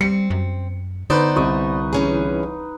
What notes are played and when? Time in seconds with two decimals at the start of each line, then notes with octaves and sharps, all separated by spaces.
0.01 G3 C4 C#7
0.30 F#2
1.10 D3 B3 D#4 B4 C5 D5
1.36 C2 D#5 C#6
1.93 E3 C#4 G#4